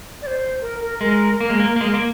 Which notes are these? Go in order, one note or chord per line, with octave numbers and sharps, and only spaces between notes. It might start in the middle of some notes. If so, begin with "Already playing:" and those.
D5
C5
A#4
A#4
G#3 A#4
A#3 A#4
G#3
A#3
A#3
G#3 A#4
A#3